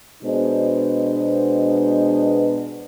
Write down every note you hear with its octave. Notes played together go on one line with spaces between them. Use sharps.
B2 G#3 B3 D4 C5